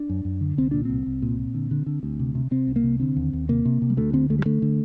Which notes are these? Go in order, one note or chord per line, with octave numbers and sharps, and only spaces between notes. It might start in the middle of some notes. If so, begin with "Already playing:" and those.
Already playing: D4
F#2
F#2
D3
C2 C4
A#2 D4
C2 C4
C2
A#2
A#2
D3
D3
D3
D2
C3
C3
C3 C4
C2
A#3
C3
D3 C4
D#2
D#2
C3 A#3
C3
C3
G3
D2 A3
D3 C4
D2 A3
G3
D3 A3
D3